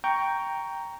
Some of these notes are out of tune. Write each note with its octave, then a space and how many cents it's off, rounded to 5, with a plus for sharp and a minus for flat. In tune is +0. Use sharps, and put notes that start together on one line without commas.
G5 +0 A#5 +0 C#6 +15